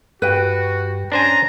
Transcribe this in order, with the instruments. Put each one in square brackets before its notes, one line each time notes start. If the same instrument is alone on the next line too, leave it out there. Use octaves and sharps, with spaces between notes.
[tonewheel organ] G2 G4 [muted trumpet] F#4 [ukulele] B4 G5
[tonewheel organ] C#4 [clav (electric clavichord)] D4 C5 G#5 [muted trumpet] A#5